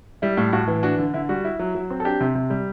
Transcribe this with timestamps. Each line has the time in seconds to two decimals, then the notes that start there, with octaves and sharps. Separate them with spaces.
0.22 G3 E4
0.37 A2
0.53 A2 F#4
0.68 E3
0.83 D4 F#4
0.98 D3
1.14 D3 E4
1.29 G3 F#4
1.45 E4
1.59 F#3
1.75 F#3
1.90 C4
2.00 A4
2.05 D4 G4
2.21 C3
2.35 C3
2.50 G3